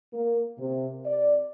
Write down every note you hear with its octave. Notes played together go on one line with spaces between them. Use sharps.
A#3
C3
D5